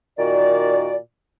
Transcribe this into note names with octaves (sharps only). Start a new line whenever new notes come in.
A#2 D#3 F#4 D5